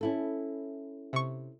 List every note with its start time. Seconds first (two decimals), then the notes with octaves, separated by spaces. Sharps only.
0.01 C#4 E4 A4
1.13 C3 C#6